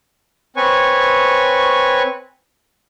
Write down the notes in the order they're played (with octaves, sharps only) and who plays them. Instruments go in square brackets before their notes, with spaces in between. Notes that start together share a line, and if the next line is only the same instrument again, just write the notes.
[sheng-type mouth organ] C4 B4 C#5 G#5 C#6